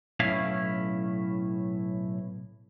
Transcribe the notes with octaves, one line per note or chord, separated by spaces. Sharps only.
B1 A2 C#4 E4 F5